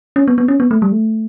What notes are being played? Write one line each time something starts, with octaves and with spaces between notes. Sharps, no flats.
C#4
B3
B3
C#4
B3
A3
G3
A3